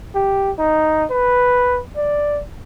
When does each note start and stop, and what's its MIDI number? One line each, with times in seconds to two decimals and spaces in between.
0.15 0.51 67
0.59 1.05 63
1.10 1.80 71
1.96 2.41 74